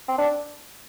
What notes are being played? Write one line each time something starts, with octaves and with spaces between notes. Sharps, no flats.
C4
D4